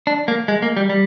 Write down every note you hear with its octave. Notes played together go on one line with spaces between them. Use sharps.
D4
A#3
G#3
A#3
G3
G3